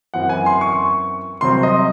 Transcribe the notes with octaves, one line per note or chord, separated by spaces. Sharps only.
F#2 E3 C4 F#5
G#5
C6
C#6
C2 C3 F#3 C4 C6
D#5